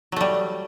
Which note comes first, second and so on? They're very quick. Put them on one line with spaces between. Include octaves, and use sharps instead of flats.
F#3 A3 G3